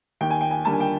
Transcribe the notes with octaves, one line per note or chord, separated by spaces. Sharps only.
D#2 G5
G#5
G5
G#5
D3 G3 A#3 A5
G#5
G5